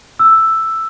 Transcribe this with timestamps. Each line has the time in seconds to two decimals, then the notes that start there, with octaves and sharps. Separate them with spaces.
0.19 E6